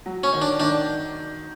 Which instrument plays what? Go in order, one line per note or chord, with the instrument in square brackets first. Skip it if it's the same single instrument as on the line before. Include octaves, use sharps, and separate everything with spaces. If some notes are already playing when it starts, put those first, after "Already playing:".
[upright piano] F#3
[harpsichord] C#4
[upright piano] D#3
[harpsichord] D4
[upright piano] D#3 [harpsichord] D4